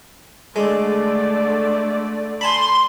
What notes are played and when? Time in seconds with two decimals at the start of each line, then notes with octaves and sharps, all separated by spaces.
0.56 D3 G#3 A3 D5
2.41 G#5 A5 B5 C6